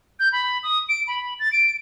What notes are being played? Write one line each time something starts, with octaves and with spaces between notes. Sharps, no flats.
G6
B5
D#6
D7
B5
A6
D7